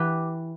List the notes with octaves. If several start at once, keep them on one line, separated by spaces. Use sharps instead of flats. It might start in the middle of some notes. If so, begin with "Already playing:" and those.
Already playing: E3 G4 B4